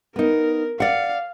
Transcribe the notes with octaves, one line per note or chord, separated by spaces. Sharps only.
B3 D#4 A#4
D5 F5 F#5